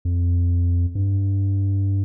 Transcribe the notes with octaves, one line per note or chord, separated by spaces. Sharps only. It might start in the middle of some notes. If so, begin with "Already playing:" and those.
F2
G2